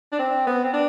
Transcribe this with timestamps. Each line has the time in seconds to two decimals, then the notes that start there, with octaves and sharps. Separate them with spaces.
0.12 D4
0.19 C4
0.47 B3
0.64 C4
0.73 D4